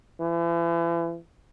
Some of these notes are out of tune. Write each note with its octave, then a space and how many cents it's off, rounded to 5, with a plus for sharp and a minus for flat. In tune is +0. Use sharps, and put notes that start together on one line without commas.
E3 +40